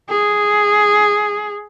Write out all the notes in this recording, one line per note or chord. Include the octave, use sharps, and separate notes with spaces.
G#4